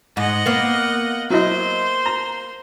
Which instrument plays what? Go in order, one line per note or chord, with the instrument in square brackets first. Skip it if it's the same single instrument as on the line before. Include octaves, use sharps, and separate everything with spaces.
[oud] G#2 [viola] D#5 F#5
[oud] A#3 B3
[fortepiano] F#3 E4 D#5 [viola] C5
[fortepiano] A#5